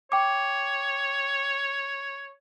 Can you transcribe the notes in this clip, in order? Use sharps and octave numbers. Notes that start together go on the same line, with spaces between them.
C#5 G5 D6